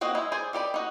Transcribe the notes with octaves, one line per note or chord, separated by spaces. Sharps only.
A#3 C4 F#4 D#5
G#3 D#4 E4
G#4 C5 D5 G#5
D#3 G4 D5 B5
D#4 F#4